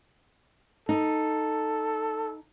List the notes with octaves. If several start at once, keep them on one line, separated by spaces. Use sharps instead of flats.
D#4 A4